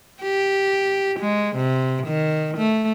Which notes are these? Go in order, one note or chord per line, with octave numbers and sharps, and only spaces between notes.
G4
G#3
C3
D#3
A3